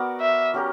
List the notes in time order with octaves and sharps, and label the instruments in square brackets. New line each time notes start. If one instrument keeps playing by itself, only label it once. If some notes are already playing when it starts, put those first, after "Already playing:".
Already playing: [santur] B3 F#4 A#4 D5
[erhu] E5
[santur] F#3 C#4 G4 A#4